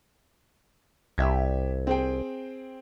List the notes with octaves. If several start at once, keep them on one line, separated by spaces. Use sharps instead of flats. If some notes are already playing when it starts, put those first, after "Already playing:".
C2 G4 E5 G#6
C4 G#4 G5